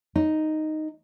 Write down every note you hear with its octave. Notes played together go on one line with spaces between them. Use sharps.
D#4